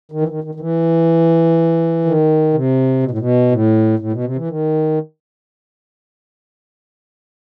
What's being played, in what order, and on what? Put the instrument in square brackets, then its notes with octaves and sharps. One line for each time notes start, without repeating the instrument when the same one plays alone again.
[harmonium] D#3
E3
D#3
D#3
D#3
E3
D#3
C3
B2
A2
B2
A2
A2
B2
C3
E3
D#3